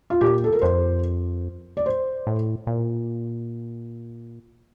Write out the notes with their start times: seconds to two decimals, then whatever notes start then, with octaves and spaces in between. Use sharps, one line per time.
0.10 F4
0.21 A#2 G4
0.44 A4
0.52 A#4
0.62 F2 C5
1.77 D5
1.86 C5
2.27 A2
2.67 A#2